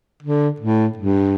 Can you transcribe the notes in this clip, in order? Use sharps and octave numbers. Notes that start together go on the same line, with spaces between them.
D3
A2
G2